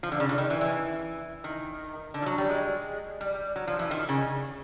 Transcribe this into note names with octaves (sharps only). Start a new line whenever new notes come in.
F3
D3
C#3
D3
D#3
E3
E3
D#3
D3
F3
F#3
G3
G#3
G3
F#3
F3
E3
D#3
C#3